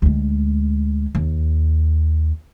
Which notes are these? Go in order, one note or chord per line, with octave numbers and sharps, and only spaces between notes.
D2 G#3
D#2